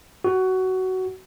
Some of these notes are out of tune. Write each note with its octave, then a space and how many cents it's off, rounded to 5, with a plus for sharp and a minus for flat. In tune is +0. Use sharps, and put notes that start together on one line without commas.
F#4 +15